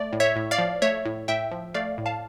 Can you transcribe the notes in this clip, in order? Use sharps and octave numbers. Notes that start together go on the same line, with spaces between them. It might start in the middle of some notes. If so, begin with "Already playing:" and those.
Already playing: A3 D5
A2
C#5 E5
A2
D5 F5
F3
A3 C#5 E5
A2
A2 E5 G5
F3
A3 D5 F5
A2
F5 A5